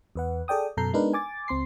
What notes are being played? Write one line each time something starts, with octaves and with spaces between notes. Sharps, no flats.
E2 B4 F#5
G#4 A4 D5 G5 D#6
F#2 B2 A4 A#5 G6 C7
G#3 B3 D4 D#4 A#4 B4
G#5 D6 A6
C#2 C4 C6 C7